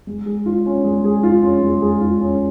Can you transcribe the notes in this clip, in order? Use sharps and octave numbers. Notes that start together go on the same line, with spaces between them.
G#3
G#4
F4
C#4
G#3
G#4
F4
C#4
G#3
G#4
F4
C#4